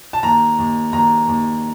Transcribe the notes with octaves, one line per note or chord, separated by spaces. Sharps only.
A5
D#2 A#5
D#2
D#2 A#5
D#2